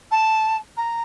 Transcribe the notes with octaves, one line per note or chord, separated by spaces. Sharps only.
A5
A#5